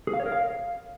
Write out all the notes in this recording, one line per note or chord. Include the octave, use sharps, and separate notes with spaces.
G#4
F5
C#5
A#4
F5